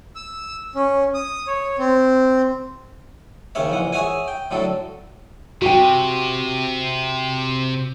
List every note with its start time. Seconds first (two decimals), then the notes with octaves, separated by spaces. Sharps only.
0.15 E6
0.75 C#4
1.14 D#6
1.47 C#5
1.78 C4
3.55 D#2 C#3 C#4 C#5 E5
3.70 A#1 E3 F#5
3.93 G#4 C#5 E5 F#5 G#5
4.28 G5
4.51 A2 D3 F#3 A4
5.62 C3 F#4 G5